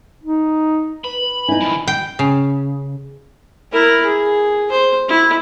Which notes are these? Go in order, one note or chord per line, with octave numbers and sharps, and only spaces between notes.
D#4
B4 B5
B4
D#4 E4 G#5
D#3 F3 B5
G5
C#3
E4 A#4
G#4
C5
E4